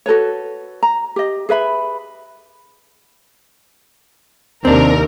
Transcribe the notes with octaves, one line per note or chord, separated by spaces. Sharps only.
F#4 A4 B4 C#5
A#5
G4 D#5
G#4 B4 E5 B5
D#2 C3 C4 D4 A#4